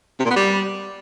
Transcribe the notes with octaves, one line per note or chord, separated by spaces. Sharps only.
C3
A#2
B3
G3